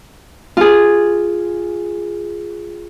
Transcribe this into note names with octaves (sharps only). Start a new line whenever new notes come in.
F4 G#4